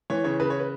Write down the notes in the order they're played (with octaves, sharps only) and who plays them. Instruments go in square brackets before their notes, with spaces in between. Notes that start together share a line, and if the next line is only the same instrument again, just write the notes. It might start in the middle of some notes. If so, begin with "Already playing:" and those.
[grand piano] E3 [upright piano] C#5
[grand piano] C#3 [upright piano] C#5
[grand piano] C#3 [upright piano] B4
[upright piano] C#5
B4